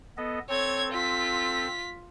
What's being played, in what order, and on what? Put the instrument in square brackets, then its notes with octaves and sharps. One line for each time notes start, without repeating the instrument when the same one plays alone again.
[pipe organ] B3 A4 D#5
[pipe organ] C4 A4 [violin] C#5 G#6
[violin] F4 B6